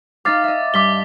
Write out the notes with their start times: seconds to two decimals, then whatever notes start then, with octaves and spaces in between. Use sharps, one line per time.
0.25 D#4 F5 D6 A6
0.44 D#5 E5
0.74 G2 D6 B6 G7